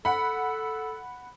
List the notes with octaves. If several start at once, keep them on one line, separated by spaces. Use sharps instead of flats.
A4 F#5 B5